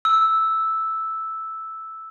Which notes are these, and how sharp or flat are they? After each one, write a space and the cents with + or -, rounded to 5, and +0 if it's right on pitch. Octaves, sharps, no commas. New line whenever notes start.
E6 -5